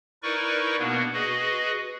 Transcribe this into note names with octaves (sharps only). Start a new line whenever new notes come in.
D#4 E4 A#4 B4 D5 C#6
B2 A#3 B3 D4
F#4 G#4 B4 D#5